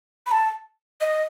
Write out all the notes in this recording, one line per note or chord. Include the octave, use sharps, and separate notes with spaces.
B5
A5
D#5